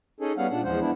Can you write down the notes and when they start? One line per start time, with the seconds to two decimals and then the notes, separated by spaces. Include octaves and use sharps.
0.20 C#4 D#4 G#4 A4
0.37 G3 B3 C#4 F5 F#5
0.50 A#2 D4 F#5
0.65 E2 F3 G#3 C5 F#5
0.81 B3 D4 E4